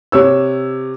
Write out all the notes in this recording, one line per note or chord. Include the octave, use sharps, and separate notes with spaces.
C3 C#5 E6